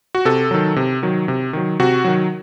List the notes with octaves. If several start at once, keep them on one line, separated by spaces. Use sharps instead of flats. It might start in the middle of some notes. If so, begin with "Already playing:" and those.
F#4
C3 A4
D#3 F#3
C3
D#3 F#3
C3
D#3 F#3
C3 F#4
D#3 F#3